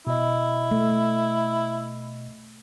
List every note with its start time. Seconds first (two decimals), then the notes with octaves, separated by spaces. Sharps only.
0.07 B2 E4 D#5
0.71 A3